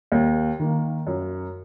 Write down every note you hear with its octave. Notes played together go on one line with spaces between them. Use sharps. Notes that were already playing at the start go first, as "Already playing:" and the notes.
D#2
D#3 A#3
F#2